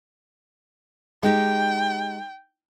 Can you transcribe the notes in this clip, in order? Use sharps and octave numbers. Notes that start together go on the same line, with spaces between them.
G#3 D#4 G4 G5